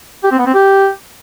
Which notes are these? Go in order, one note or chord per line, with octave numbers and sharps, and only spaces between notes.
G4
C4
B3
C4
G4